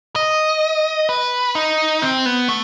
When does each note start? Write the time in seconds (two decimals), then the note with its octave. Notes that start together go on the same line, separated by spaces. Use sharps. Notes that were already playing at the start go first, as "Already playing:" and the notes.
0.16 D#5
1.09 B4
1.55 D#4
2.02 C4
2.26 B3
2.49 A3